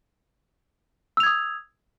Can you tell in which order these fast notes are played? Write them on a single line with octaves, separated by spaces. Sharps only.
E6 F7 G#6 D#6